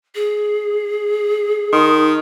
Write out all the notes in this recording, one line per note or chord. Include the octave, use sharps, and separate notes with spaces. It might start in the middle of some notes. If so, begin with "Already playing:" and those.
G#4
D#3 D#4 C6 D#6